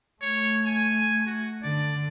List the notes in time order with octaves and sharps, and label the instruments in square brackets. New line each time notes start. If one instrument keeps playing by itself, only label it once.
[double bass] A3 [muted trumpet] C#5
[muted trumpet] G#5
F#4
[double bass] D3 [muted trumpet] D5